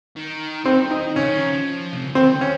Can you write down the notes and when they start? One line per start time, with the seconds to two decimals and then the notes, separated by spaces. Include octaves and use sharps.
0.16 D#3
0.65 D#3 C4
0.91 D#4
1.16 C#3 C#4
1.29 D#3
1.41 F3
1.53 F3
1.93 C3
2.05 C#3
2.15 D#3 C4
2.41 C#4